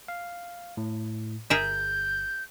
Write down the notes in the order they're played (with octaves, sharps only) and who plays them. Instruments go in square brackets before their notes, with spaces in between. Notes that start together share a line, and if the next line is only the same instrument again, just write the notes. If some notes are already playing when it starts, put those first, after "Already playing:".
[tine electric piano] F5
A2
[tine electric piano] G1 [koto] G#4 A#4 E5 [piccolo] G6